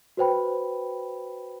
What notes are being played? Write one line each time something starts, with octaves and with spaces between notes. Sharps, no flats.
F#4 B4 C5 G5 B5